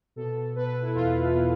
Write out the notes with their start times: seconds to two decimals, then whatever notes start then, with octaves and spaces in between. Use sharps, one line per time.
0.16 B2 A4
0.55 B2 B4
0.82 E4
0.95 E2 F4
1.34 B2